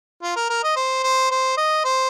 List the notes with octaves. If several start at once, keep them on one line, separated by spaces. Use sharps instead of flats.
F4
A#4
A#4
D#5
C5
C5
C5
D#5
C5